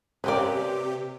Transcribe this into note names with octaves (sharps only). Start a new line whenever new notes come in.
C3 A#3 C4 C#4 G4 B4 D5